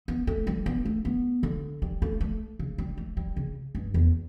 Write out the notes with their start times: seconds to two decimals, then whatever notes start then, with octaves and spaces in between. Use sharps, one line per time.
0.08 B3
0.27 A3
0.47 G3
0.66 B3
0.85 A3
1.05 B3
1.43 D3
1.82 G3
2.02 A3
2.21 A3
2.59 C#3
2.78 G3
2.97 A3
3.17 G3
3.36 C#3
3.75 G2
3.94 E2